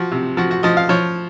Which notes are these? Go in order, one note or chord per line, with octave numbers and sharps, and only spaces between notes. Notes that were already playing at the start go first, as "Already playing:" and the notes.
Already playing: F3 F#4
C3
F3 F#4
F#4
F3 D#5
F5
F3 C#5